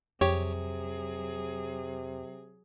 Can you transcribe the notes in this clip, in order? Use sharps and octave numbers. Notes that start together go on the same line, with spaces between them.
F2 C3 F#3 G4 G#4 C#5